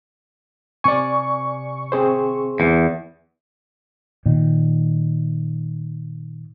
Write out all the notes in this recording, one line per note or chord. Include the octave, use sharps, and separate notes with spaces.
C3 D5 G#5 C#6
C4 G#4 C5
E2
A#2 D#3